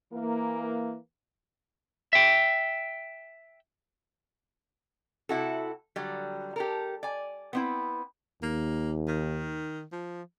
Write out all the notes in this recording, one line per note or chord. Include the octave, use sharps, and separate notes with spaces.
E3 A#3
E5 G5
C3 E4 F#4 A4
D3 F#3 G3
G4 A4 A#4
D5 G#5
B3 C4 E4
D#2 A#3
D#3
F3